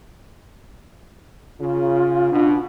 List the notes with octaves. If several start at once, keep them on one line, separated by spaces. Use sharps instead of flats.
C#3 F4
B2 D4